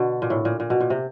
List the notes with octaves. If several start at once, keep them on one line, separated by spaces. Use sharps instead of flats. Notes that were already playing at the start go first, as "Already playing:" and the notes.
Already playing: B2 D3
A#2
A2
A#2
A#2
B2
A#2
C3